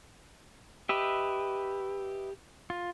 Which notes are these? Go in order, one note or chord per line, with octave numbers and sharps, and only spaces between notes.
G4 B4 D#5 E5
F4